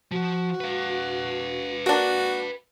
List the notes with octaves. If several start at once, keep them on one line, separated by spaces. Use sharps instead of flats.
F3 F#4
B4 F5
A#3 D4 F#4